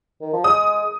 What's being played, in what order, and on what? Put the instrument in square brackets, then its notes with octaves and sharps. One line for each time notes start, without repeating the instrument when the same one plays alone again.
[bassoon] D#3
F3
[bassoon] G#3 [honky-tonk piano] D#6